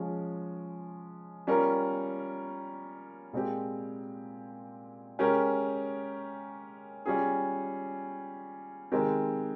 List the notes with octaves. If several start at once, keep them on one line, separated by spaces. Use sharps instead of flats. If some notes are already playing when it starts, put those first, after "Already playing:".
Already playing: F3 G#3 C#4
G3 C#4 F4 A#4
A#2 G#3 C4 G4
G#3 C#4 G4 A#4
G3 C#4 F4 G#4
D#3 G#3 C4 G4 A#4